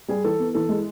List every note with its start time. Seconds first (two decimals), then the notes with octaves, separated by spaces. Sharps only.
0.08 G3 G#4
0.24 E3 A4
0.39 B3
0.54 E3 A4
0.69 G#3